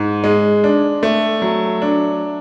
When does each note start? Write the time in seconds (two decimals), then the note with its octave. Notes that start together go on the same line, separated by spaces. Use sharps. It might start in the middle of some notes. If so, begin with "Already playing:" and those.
Already playing: G#2
0.24 G#3
0.64 D4
1.03 A3
1.42 F#3
1.82 D4